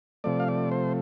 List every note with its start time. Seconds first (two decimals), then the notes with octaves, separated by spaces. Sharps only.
0.24 C3 F3 A3 D5
0.40 F5
0.48 D5
0.72 C5